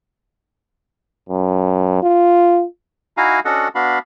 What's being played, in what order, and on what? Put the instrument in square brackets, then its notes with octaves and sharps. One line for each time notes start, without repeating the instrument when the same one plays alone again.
[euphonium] F#2
F4
[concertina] D#4 E4 F#4 F5 G#5 A#5
C#4 D4 F#4 A4 D#5 F#5
B3 D4 F#4 F5 B5